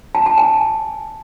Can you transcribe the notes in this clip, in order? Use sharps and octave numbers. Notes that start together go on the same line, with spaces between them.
A5
A5
G#5